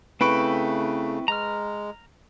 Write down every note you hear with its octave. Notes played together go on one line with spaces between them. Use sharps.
C#3 A3 C4 E4 B4 G5 B5 C#6
G#3 A#5 F6